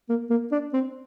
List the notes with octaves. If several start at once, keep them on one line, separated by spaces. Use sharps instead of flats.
A#3
A#3
D4
C4